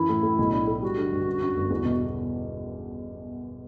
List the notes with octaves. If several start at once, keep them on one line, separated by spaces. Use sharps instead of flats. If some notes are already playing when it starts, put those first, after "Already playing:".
Already playing: F#2 E3 E4
A2
A2
B1
D4
A3
G3 F#4
D3
G2
F#2
F#2
G1
E2
B2